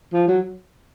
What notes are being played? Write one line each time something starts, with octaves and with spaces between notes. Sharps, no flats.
F3
F#3